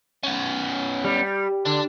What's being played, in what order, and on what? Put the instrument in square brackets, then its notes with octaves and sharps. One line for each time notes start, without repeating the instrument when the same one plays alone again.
[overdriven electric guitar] B3 C#4
[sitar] G3
[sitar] D3 [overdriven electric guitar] D4